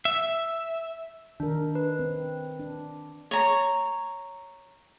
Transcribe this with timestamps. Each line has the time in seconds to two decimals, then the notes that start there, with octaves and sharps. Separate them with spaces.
0.05 E5
1.40 D#3 D4 A#4
1.75 B4
1.99 C4
2.59 D4
3.31 C#5 A#5